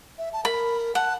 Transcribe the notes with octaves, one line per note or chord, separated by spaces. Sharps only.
E5
A5
A#4 B5
F#5 A5